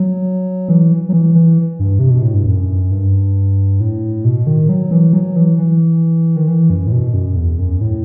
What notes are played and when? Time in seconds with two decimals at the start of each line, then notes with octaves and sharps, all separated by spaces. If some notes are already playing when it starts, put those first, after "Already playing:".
Already playing: F#3
0.68 E3
1.09 F#3
1.13 E3
1.35 E3
1.79 G2
1.99 C3
2.10 B2
2.23 A2
2.34 G2
2.46 F#2
2.91 G2
3.80 A2
4.25 B2
4.47 D#3
4.69 F#3
4.91 E3
5.13 F#3
5.36 E3
5.58 E3
6.36 D#3
6.48 E3
6.70 F#2
6.87 A2
6.92 B2
7.14 F#2
7.36 E2
7.59 F#2
7.81 A2